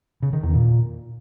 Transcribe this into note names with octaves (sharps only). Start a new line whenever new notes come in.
C#3
D#3
E2
A#2